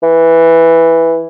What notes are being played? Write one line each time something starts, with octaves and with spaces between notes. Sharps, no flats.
E3